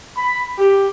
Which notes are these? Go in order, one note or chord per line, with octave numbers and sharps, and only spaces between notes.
B5
G4